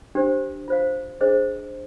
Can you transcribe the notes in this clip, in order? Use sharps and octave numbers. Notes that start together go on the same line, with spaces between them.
D4 G4 C5
F4 C5 F5
D4 G#4 C5 D#5